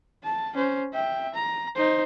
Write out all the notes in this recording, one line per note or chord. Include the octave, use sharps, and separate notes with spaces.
A5
C#4 C5
E5 G5
A#5
D#4 C5